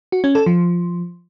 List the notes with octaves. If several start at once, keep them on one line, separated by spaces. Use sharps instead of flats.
F#4
C#4
A4
F3